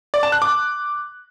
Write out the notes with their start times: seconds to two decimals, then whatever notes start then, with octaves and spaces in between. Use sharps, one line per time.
0.14 D5
0.23 A5
0.32 F#6
0.42 D6